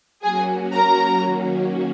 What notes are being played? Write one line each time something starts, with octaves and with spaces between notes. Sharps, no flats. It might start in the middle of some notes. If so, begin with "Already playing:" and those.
F#3 A#3 C#4 F#4 G#4 G#5
A#4 A#5
D#3 F#3 A#3 C#4 F#4